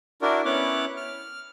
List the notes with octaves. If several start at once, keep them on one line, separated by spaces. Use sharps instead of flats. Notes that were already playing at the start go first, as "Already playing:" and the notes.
D4 E4 F#4 A#4 D5
B3 C#4 E4 C#5 D6 F#6
F6